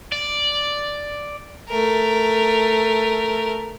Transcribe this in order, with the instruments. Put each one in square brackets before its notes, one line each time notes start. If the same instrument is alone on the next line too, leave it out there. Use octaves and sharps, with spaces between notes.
[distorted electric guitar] D5
[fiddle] A3 A#4